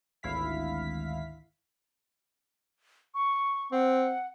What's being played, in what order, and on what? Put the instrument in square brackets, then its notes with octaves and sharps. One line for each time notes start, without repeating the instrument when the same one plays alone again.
[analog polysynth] G#1 D2 E4 F5 B6
[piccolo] C#6
[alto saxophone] C4 [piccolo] F#5